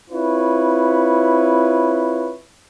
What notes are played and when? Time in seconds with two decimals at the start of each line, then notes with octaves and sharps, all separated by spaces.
0.11 C4 E4 F4 B4 C#5